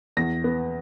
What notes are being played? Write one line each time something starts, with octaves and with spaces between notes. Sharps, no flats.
E2 A#6
B3